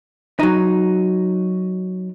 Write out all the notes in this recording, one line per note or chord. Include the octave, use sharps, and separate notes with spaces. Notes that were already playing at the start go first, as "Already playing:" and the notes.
F#3 D#4